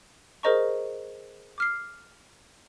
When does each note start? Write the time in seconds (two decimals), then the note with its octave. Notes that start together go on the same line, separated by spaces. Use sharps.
0.43 G#4 A#4 C5 D#5 A#5 C#6
1.58 D6 F6 C7